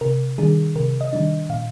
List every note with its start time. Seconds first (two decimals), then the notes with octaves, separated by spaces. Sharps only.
0.01 C3 A#4
0.38 D#3 G3 D4 G#4
0.75 C3 A#4
1.01 D#5
1.13 D#3 G3 D4
1.49 A#2 F5